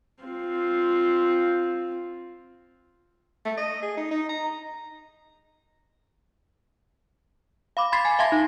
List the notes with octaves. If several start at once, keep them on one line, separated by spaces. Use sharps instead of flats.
C4 F4
A3
D#5
G#4
D#4
D#4
A#5
F5 B5 D6
B5 C6 G#6 A6 B6 C7
G#5
E5 F5 A5 C6 G#6 A#6
D#4